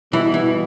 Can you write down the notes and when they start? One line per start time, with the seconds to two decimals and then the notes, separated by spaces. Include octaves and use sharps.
0.13 B2 E3 G3 B3
0.34 E3